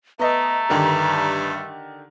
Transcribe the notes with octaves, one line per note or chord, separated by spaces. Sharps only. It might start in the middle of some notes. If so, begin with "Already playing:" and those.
A3 B3 D#5 A#5
G2 D3 D#3 G4